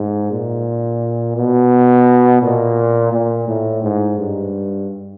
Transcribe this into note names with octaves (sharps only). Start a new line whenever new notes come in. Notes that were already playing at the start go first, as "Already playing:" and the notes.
Already playing: G#2
A#2
B2
A#2
A#2
A2
G#2
G2